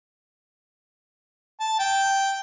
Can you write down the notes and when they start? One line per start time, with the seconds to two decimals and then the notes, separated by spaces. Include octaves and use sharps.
1.60 A5
1.79 G5